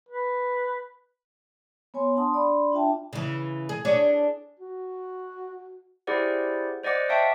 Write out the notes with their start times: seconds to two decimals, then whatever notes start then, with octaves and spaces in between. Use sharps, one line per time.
0.09 B4
1.94 B3 C#5 G#5 C6
2.16 D4 F#5 A5 C6 D#6
2.33 D4 D5 B5 C6
2.72 D4 F4 E5 G5 A5
3.13 C#3 E3
3.69 G#4
3.85 D4 G#4 C#5
4.59 F#4
6.07 E4 G4 G#4 C5 D5 F#5
6.84 C5 D5 D#5 F#5 D6
7.09 E5 F5 G5 A5 C#6 D6